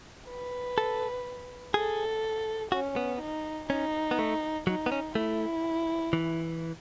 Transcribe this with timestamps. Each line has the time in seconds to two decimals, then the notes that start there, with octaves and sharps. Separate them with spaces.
0.29 B4
0.78 A4
1.74 G#4 A4
2.72 C#4 F#4
2.96 B3
3.20 D#4
3.69 C#4 D#4
4.11 B3
4.19 A3
4.67 F#3 D#4
4.86 B3
4.92 C#4
5.15 A3 E4
6.13 E3